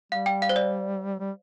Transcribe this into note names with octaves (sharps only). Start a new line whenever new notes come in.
G3 F5
G5
F5
C5
D5
G3